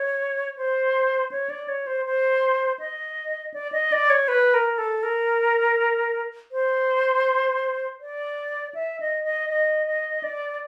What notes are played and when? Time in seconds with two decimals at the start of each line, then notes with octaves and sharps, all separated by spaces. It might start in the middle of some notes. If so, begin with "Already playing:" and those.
Already playing: C#5
0.57 C5
1.32 C#5
1.50 D5
1.68 C#5
1.87 C5
2.06 C5
2.79 D#5
3.54 D5
3.72 D#5
3.92 D5
4.10 C#5
4.28 B4
4.54 A#4
4.78 A4
5.03 A#4
6.52 C5
8.01 D5
8.74 E5
9.00 D#5
9.24 D#5
9.50 D#5
9.87 D#5
10.23 D5